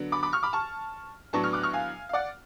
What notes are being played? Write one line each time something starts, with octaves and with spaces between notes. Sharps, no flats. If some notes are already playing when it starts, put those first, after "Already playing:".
Already playing: D3 F#3 B3 D4
B5 D6
B5 D6
C#6 F6
B5 D6
A5 C#6
A2 F#3 B3 D4 A5 C#6
C#6 F6
D6 F#6
C#6 F6
F5 G#5
F5
D5 F#5